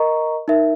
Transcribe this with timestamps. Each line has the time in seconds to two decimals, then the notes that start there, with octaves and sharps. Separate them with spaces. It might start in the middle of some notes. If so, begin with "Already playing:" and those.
Already playing: A#4 D#5 A#5 C#6
0.48 D#4 A#4 E5